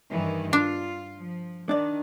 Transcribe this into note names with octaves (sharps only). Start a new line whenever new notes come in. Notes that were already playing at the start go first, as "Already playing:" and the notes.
G2 D#3 E3
D4 F4
F3
D#3 D4 D5